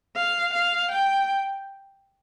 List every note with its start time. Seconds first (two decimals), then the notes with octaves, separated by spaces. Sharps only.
0.16 F5
0.53 F5
0.91 G5